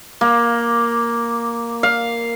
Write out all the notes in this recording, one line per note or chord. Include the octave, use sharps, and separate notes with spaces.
A#3
F5